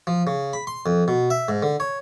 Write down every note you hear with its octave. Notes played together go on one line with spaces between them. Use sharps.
F3
C#3
B5
C6
F2
B2
E5
G#2
D3
C#5